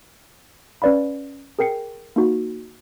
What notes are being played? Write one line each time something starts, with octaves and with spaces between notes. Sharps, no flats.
C#4 B4 D5 F5 B5
G#4 A#4 G5 C7 C#7
A#3 D#4 F#4